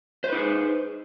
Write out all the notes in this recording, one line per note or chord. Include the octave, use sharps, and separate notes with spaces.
D#4 G#4 B4 C5